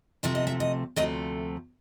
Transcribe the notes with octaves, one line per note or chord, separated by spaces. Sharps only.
D2 C3 F3 A3 E5
D#5
E5
D#5
D2 C3 F3 A3 D#5